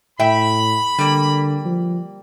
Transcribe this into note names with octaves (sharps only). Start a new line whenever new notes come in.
A2 E5 G5 B5
D3 G3 A#3
F3